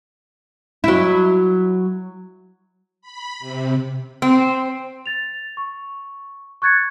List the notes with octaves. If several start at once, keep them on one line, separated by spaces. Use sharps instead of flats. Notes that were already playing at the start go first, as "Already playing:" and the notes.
F#3 E4
B5
C3
C4
A6 F7
C#6
C#6 F#6 G#6 A6 C#7